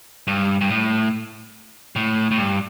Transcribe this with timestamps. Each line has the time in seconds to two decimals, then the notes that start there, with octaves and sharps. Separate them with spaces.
0.27 G2
0.61 G2
0.70 A2
1.96 A2
2.31 A2
2.38 G2